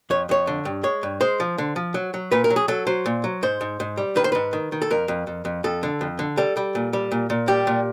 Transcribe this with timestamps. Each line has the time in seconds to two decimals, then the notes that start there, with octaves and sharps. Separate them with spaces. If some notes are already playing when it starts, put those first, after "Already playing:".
0.10 F2 C#5
0.29 F2 C#5
0.47 D3
0.65 G2
0.83 G#3 C#5
1.03 G2
1.21 G#3 C5
1.40 F3
1.58 D3
1.76 F3
1.94 F#3
2.14 F#3
2.32 A#2 B4
2.44 A#4
2.50 F#3
2.56 G#4
2.68 F#3 A4
2.87 F#3 C5
3.06 A#2
3.24 F#3
3.43 G#2 C5
3.61 G#2
3.80 G#2
3.97 G3
4.16 D#3 B4
4.24 C5
4.32 G#2 B4
4.53 D#3
4.72 D#3
4.82 A4
4.90 F2 A#4
5.08 F2
5.27 F2
5.45 F2
5.64 F2 A4
5.83 D3
6.01 F2
6.19 D3
6.37 G3 A4
6.57 G3
6.75 A#2
6.93 G3
7.11 A#2
7.30 A#2
7.48 G3 G4
7.67 A#2